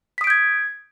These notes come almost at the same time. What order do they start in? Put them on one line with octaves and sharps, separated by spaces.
B6 D#6 D7 G6 G#6